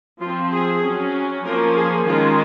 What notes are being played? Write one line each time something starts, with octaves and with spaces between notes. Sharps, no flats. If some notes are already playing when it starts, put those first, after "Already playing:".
F3 C4 F4
G#4
F#3 C#4
F3 A#3 C#4 A#4
G#4
D#3 G#3 C#4 F4